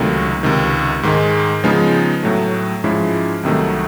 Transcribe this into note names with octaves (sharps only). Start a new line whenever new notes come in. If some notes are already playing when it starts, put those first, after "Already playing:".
Already playing: C#2 C3 D#3 F#3 A3
C#2 C3 D#3
G#2 D#3 G#3
C#3 F3 G#3 B3 D#4
A2 F#3 A3
G#2 F3 G#3 C#4 E4
C2 C3 D#3 F#3 A3